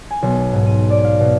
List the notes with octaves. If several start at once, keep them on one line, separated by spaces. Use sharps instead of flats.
G#5
B1
G#2
D#7
D5
F5
B2